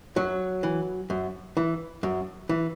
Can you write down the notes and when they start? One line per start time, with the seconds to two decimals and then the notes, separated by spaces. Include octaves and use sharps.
0.16 F#2 F#3
0.63 E3
1.10 F#2
1.57 E3
2.03 F#2
2.49 E3